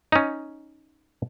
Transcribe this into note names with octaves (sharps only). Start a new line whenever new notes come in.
C#4 D#4